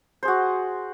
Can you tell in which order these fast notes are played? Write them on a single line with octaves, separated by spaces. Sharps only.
C5 G#4 F#4